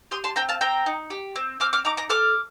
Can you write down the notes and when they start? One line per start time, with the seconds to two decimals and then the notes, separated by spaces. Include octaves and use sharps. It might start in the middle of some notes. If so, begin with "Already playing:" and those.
0.11 G4 C6 D#6
0.24 A5 C6
0.36 C4 G5 A#5
0.49 F5 A5
0.61 C4 G5 A#5
0.86 D#4
1.10 G4
1.36 C4
1.60 C4 D6 F6
1.73 D6 F6
1.85 D#4 A#5 D6
1.97 A#5 D6
2.09 A4 D6 F6